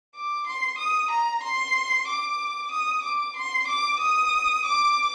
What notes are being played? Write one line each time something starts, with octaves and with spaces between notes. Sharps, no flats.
D6
C6
D#6
A#5
C6
D6
D#6
D6
C6
D6
D#6
D6